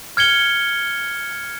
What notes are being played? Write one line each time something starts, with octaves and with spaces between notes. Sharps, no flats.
F6 G#6 C#7 G7